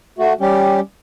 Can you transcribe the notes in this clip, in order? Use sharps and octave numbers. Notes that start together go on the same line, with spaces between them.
A3 F#4
G3 C#4 G4